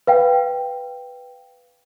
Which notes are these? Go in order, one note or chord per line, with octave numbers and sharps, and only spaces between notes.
B4 F5 G5